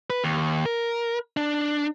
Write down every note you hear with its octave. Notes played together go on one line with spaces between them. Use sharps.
B4
D#2
A#4
D4